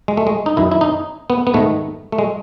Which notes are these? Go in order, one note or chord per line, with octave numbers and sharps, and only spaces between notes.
G#3
A3
G#3
D#4
F#2 D#3 E4
E4
D#4
B3
B3
G#2 D#3 A3
A3
G#3